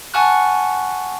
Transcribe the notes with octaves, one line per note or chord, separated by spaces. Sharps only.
F#5 G#5 A5 C#6 F6 F#6